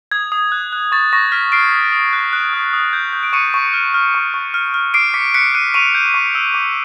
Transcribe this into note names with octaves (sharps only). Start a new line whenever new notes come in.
D#6 G#6
D#6
F#6
F#6
C#6 A6
C#6 A#6
F6 B6
F6 C7 D7
D#6
D#6
F#6
F#6
D#6
D#6
G6
G6
D7
C#6 C#7 D#7
C#6
F6
F6
C#6
C#6
F6
F6
D6 C7 D7
D6 B6 C#7
F#6 B6 C#7
F#6 C#7 D#7
C#6 D#7 F7
G6
C#6
E6
D6